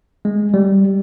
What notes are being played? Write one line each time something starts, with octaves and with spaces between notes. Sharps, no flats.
G#3
G3